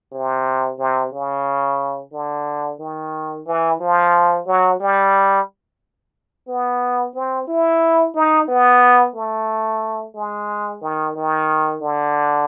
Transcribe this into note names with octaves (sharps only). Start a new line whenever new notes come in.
C3
C3
C#3
D3
D#3
E3
F3
F#3
G3
B3
C4
E4
D#4
B3
A3
G#3
D#3
D#3
D3